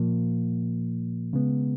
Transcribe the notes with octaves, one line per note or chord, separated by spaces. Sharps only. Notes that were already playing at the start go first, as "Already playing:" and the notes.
Already playing: A#2 F3 A#3
C#3 G#3 B3